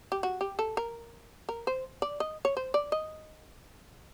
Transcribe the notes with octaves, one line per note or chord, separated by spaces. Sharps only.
G4
F#4
G4
A4
A#4
A#4
C5
D5
D#5
C#5
C5
D5
D#5